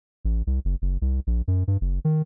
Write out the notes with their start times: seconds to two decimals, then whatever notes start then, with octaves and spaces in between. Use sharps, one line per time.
0.25 A1
0.47 C2
0.65 F#1
0.82 F#1
1.02 C2
1.27 A#1
1.48 F#2
1.68 G2
1.81 F#1
2.05 D#3